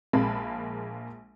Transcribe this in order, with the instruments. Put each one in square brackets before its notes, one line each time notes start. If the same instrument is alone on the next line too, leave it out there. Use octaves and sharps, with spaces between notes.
[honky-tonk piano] A#1 G#3 A#3 A5 B5